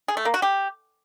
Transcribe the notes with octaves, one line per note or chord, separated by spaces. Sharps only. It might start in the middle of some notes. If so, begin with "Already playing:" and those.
G#4
A3
A#3
F#4
G4